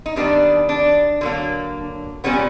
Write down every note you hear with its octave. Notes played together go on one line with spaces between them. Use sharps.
D#4
D#3 G3 B3 D4
D4
D3 F#3 A#3
A#2 G3 B3 C#4